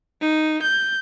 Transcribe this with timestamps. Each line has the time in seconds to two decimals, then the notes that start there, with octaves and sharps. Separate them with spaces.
0.21 D#4
0.63 G6